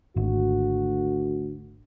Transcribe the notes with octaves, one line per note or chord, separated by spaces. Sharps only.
G#1 D2 F#4